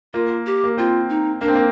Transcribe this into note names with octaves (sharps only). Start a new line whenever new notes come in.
A#3 F4
G4
A#3
C4 F4
D#4
A#3 D4
C4
A#3